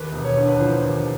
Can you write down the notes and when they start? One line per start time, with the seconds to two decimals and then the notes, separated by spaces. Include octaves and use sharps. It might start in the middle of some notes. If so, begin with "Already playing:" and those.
Already playing: D#2 B4
0.12 E1
0.25 C#5
0.37 D3
0.48 B4
0.60 F3 C5
0.85 D#2